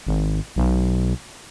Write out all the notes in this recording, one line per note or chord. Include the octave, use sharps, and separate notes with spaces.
G#1
B1